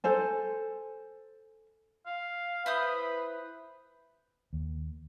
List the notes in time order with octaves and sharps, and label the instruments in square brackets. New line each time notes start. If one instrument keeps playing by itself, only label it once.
[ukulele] A4 C5 G#5
[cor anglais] F5
[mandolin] E4 C5 D#6 [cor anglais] B4
[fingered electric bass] D#2